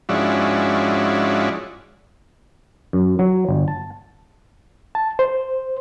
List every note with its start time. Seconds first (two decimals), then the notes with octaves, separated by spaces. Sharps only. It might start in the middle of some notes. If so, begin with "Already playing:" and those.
0.09 G#2 F3 C#4 D4 E4 F#4
2.93 F#2
3.19 F#3
3.49 G1
3.68 A5
4.95 A5
5.19 C5